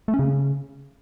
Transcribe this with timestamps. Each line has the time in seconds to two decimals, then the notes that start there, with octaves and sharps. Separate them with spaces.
0.08 A3
0.14 C#4
0.19 C#3